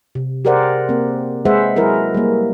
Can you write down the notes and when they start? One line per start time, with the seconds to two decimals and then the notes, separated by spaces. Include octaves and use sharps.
0.15 C3
0.45 G4 G#4 A#4 C5 D5 F#5
0.89 A#3 C4
1.45 G#3 G#4 B4 C5 E5 F#5
1.76 F#3 E4 G#4 A#4 B4
2.15 G3 A#3